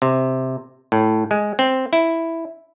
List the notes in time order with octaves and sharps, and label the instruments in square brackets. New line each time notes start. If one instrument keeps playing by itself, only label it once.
[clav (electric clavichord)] C3
A2
G#3
C4
E4